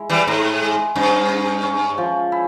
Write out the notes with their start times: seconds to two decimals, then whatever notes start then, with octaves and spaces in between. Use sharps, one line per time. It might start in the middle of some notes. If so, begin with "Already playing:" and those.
Already playing: G#3 E4
0.10 E3 G3
0.27 G#2 E4
0.62 G#3
0.95 G2 C#4
1.29 C#4
1.63 C#4
1.98 F3
2.32 E4